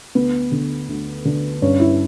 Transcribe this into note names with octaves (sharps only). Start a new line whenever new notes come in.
D2 B3
D3
D2
D3
G2 C#4
E4